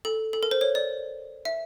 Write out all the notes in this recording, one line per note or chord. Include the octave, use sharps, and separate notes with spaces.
A4
A4
A#4
C5
C#5
D5
E5